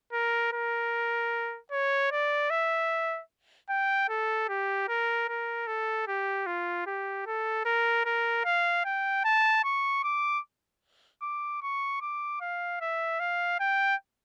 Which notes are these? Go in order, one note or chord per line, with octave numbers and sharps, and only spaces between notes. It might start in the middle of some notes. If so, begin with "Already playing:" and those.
A#4
A#4
C#5
D5
E5
G5
A4
G4
A#4
A#4
A4
G4
F4
G4
A4
A#4
A#4
F5
G5
A5
C#6
D6
D6
C#6
D6
F5
E5
F5
G5